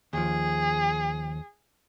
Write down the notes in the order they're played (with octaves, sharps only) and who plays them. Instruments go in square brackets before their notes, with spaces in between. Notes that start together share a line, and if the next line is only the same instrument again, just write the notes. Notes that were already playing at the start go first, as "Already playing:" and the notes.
[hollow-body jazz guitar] D#2 F3 [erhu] G#4